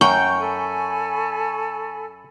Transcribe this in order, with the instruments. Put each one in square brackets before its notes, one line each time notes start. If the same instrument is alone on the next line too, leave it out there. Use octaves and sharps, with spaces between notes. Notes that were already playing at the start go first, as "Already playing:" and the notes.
[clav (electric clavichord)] F#2 [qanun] G5 [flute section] A#5 [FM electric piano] C#6
[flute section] A4 G#5 B5